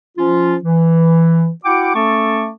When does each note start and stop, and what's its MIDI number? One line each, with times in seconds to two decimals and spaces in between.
0.18 0.56 53
0.18 0.56 61
0.18 0.56 65
0.63 1.50 52
1.64 1.92 64
1.64 1.92 66
1.64 1.92 78
1.64 1.92 79
1.64 1.92 86
1.95 2.49 57
1.95 2.49 61
1.95 2.49 69
1.95 2.49 81
1.95 2.49 85
1.95 2.49 86